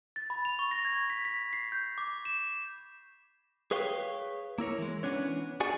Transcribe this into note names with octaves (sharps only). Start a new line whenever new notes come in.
A6
B5
F7
C#6
A#6
G#6
B6
B6
C7
G6
D6
E7
G#4 B4 C#5 F5 G5
A#3 E4 A#4 C#5
E3 G#3
E3 A#3 B3 C#4 D4 C#5
F#4 G#4 D5 F#5 G#5